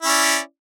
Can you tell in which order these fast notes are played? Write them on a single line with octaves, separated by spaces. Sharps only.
E4 C#4 D5